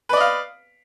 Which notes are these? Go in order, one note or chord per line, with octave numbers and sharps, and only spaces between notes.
B4 D5 D#5 F5